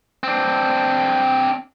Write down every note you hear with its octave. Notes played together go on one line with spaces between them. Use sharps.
C4 D4